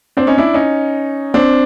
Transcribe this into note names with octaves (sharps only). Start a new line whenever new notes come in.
C4 D4
C#4 D#4
D4 E4
C#4 D#4
C4 D4